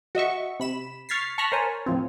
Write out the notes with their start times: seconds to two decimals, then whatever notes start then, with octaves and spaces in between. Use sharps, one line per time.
0.15 F#4 D#5 E5 C#6
0.60 C3 B5 E7
1.09 C#6 F6 G#6 A6 B6 C7
1.38 A5 C#6 F6 F#6 A#6 B6
1.52 A#4 C5 C#5 G#5 A5
1.86 A2 F3 C4